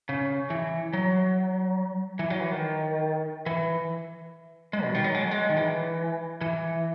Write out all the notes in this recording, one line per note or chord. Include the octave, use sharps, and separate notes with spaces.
C#3
E3
F#3
E3
F#3
E3
D#3
E3
G#3
B2
D#3
F#3
G#3
F#3
G#3
D#3
E3
E3